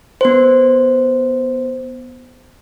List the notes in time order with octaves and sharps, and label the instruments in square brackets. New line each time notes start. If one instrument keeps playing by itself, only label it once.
[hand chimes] B3 C5